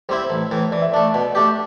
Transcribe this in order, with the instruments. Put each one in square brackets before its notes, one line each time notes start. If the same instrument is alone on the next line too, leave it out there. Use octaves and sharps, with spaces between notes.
[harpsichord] G3 C4 E4 [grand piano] C5
[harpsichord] A1
A2 E3
[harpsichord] E3 [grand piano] D5
[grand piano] E5
[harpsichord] A3 D4 [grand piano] D5
[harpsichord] B2
A3 D4 G4